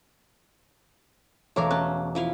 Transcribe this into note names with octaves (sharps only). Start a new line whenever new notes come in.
E1 A3 A#4 C#5 F5 D6
C#4 A5 F#6
F3 E4 F5